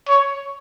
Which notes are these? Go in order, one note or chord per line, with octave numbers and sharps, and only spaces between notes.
C#5